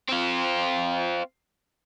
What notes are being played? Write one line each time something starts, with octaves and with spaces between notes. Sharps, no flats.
C4 F4